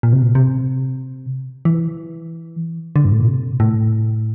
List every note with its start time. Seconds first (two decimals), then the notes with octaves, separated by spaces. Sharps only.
0.03 A#2
0.13 C3
0.22 A#2
0.35 C3
1.65 E3
2.96 D3
3.05 G2
3.12 A2
3.21 A#2
3.27 C3
3.60 A2